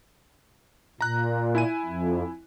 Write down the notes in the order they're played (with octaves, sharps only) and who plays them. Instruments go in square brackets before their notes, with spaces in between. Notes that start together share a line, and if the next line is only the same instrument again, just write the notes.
[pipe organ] A#2 [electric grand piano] A#5 F#6
[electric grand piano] E4 G#5 D#7
[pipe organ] F2